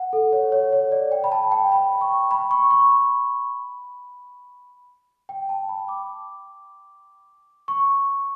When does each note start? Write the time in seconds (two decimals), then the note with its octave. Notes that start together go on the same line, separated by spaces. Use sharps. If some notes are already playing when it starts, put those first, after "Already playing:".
Already playing: F#5
0.13 A4
0.33 C#5
0.52 C#5
0.73 C#5
0.92 D5
1.12 G5
1.24 B5
1.32 A5
1.52 G5
1.72 B5
2.01 C#6
2.31 B5
2.51 C#6
2.71 C#6
2.91 B5
5.29 G5
5.49 A5
5.69 B5
5.88 D6
7.68 C#6